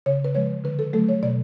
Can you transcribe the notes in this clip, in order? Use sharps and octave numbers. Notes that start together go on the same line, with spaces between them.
C#3 C#5
B4
F3 G#3 C#5
D3 B4
A4
F#3 A3 A4
C#5
B2 D5